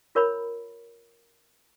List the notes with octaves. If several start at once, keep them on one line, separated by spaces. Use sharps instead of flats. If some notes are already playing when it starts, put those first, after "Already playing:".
F4 A#4 C#5 A#5 B5